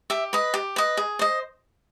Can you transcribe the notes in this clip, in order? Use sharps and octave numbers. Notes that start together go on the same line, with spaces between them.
G4 E5
B4 D#5
G4
B4 D#5
G#4
C5 D#5